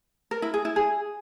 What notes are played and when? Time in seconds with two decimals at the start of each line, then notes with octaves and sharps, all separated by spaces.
0.31 A#4
0.42 E4
0.54 G#4
0.65 E4
0.76 G#4